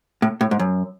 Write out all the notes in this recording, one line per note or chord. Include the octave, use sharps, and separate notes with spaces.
A2
A2
G#2
F#2